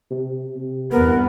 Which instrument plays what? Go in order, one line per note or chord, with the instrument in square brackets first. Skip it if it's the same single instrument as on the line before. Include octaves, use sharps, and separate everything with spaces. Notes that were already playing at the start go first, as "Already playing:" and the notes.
[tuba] C3
C3
[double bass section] E2 G2 B3 [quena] A#4